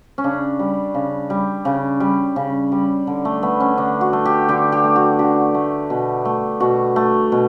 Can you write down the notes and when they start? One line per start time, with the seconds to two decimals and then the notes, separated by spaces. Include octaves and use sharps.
0.18 C#4
0.24 C#3 D4
0.59 G3
0.94 C#3
1.30 G3
1.65 C#3
2.00 G3
2.36 C#3
2.72 G3
3.07 D3
3.25 A3
3.43 A3 B3
3.60 C#4
3.78 D3 D4
4.01 F#4
4.13 A3
4.25 G4
4.48 D3 G4
4.72 G4
4.84 A3
4.96 F#4
5.19 D3 G4
5.54 A3
5.90 B2
6.25 A3
6.60 B2 F#4
6.96 A3
7.32 B2